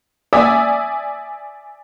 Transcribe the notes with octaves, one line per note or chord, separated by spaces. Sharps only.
D5 E5 G#5 D#6 E6